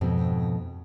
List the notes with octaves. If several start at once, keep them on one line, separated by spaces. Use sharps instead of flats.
F2 G#2 B2 C4